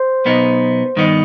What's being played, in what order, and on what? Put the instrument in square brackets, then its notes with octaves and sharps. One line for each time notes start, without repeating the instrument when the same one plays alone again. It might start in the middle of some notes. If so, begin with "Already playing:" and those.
Already playing: [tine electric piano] C5
[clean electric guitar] B1 B2 B3 D#4
G2 D#3 B3 D#4